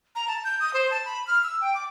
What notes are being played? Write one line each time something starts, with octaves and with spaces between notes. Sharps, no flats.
A#5
A5
G6
D#6
C5
A5
B5
F6
E6
G5
D6